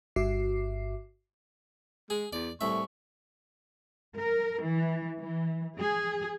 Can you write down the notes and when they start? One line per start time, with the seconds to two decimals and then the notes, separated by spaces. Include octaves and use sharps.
0.16 G1 G2 F#4 E5 D6 C7
2.10 G#3 G#4
2.33 E2 D5
2.61 C2 A2 E5 C#6
4.17 A#4
4.61 E3
5.18 E3
5.79 G#4